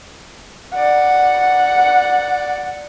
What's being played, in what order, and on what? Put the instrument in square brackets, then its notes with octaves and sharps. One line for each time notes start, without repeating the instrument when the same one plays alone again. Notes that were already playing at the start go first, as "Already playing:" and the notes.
[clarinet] D5 [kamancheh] F#5